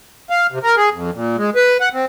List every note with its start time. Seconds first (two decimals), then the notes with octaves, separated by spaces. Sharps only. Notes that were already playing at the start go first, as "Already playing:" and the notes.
0.30 F5
0.52 C3
0.63 A#4
0.77 G#4
0.94 F2
1.14 A#2
1.38 G#3
1.56 B4
1.81 F#5
1.94 C4